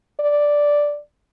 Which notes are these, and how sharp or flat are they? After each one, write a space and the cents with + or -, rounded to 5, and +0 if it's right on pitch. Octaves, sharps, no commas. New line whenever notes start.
D5 +0